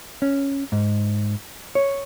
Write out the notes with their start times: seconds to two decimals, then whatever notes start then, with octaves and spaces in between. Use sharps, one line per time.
0.22 C#4
0.72 G#2
1.75 C#5